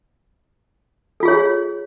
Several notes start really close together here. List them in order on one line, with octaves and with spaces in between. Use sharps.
A4 F4 G#4 C#5